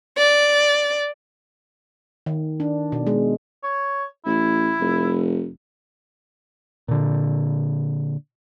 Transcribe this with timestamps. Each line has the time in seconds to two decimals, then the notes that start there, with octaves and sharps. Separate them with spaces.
0.18 D5
2.26 D#3
2.60 D4
2.92 B2
3.07 G#3
3.63 C#5
4.26 A1 E4
4.80 F1
6.88 A#2 D3